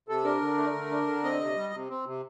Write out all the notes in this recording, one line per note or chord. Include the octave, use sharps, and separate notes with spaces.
C3 A4
D4 A#4
D3
A3
D3
D4
D3
C4 D#5
C3
G3
C3
C4
C3